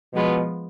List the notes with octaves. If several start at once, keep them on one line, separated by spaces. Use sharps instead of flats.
B2 F3 G#3 B3 F4